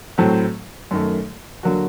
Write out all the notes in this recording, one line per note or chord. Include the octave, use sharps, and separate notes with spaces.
A2 F#3 A3 C4
F#2 D#3 A3
D3 F#3 A#3 F#4